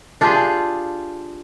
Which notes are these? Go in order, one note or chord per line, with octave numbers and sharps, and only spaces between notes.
D4 F4 G4 G#4